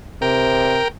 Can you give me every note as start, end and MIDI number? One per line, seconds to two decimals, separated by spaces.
0.22 0.81 48
0.22 0.88 70
0.22 0.88 79